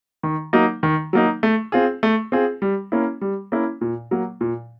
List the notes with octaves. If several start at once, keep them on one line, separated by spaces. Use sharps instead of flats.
D#3
F#3 A#3 D#4
D#3
F#3 A#3 D#4
A3
C4 F4 G#4
A3
C4 F4 G#4
G3
A#3 C#4 E4
G3
A#3 C#4 E4
A#2
F#3 A#3
A#2